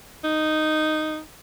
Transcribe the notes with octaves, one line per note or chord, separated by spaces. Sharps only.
D#4